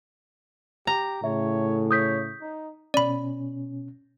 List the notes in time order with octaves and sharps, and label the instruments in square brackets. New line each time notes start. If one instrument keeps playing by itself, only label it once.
[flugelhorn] G4 [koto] A#5
[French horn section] A2 C#3 [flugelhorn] C#5 [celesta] E5
[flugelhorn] C#5 [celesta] D#6 G6 B6
[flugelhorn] D#4
[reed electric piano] B2 C#4 [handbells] D5 B5